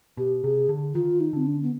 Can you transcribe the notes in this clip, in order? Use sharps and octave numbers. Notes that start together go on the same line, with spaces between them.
B2 G4
C3 G#4
D3
D#3 F4
D#4
D3 C4
D4
B3